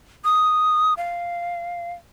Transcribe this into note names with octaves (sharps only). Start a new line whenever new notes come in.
D#6
F5